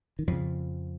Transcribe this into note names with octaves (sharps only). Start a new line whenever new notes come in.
D#3
F2 C#3 F3